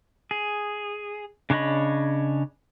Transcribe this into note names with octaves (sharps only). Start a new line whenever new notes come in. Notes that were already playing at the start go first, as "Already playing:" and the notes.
G#4
C#3 D4 C#5 D#5 B5